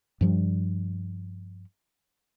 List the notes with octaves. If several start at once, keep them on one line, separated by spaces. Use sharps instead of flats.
G2 F3 G3